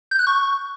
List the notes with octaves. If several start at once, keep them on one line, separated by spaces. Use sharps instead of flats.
G6
F#6
C#6